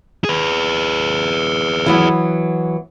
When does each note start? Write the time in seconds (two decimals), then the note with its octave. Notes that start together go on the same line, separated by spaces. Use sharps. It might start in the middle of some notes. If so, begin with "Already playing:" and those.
0.25 G#4 B4
1.86 E3 F#3 B3